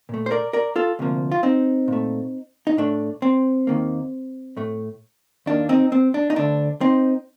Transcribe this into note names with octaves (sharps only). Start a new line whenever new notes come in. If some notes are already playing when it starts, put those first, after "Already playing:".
A#2 A3
C5
A#4 D5
A#4 D5
F4 A4
D2 C3 F3 A#3
F4
C4 D#4
A#2 A3
D#4
A2 A3 D4
C4
D#2 D#3 A#3
A2 A3
D#2 D#3 G3 A#3 D4
C4 D#4
C4
D4
D#4
D2 D3 A3 D4
C4 D#4